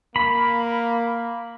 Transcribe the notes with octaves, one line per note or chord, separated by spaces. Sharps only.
A#3 B5